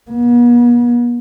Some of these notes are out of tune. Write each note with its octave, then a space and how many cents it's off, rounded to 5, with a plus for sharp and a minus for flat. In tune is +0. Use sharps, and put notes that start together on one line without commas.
B3 -45